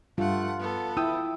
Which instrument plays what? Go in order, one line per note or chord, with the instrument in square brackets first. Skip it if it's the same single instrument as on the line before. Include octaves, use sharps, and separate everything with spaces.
[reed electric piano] G2 [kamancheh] A3 F#5 [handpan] F4
[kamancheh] B3 A4
[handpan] E4 [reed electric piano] G5 D#6 E6